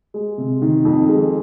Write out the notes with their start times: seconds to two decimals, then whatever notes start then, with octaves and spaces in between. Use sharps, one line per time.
0.14 G#3
0.38 C3
0.62 D#3
0.85 F2
1.09 G#3